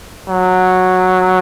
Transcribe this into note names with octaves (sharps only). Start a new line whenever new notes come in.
F#3